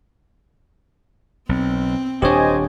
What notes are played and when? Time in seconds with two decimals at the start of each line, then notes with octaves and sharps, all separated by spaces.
1.49 B1 C4
2.22 D#1 D4 G4 C5 C#5 D#5 G#5